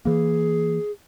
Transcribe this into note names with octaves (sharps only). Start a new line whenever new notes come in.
E3 A#3 G#4